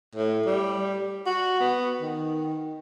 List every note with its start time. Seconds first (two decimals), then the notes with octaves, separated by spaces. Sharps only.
0.15 A2
0.46 G3
1.26 F#4
1.60 B3
2.02 D#3